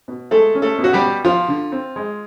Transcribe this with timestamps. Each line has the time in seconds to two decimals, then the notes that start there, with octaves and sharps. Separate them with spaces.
0.08 B2
0.31 G#3 A3 A4
0.55 C#4
0.62 A3 A4
0.78 B2
0.84 F#4
0.93 G3 G4
1.01 B2
1.25 F3 F4
1.48 D3
1.72 C4
1.96 G#3